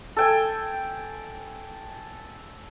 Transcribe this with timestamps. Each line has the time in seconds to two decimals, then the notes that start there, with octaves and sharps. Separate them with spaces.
0.16 A4 G5 G#5